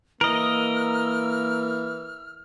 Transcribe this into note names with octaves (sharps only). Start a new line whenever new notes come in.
E3 A#3 A#4 D#5 E6 F6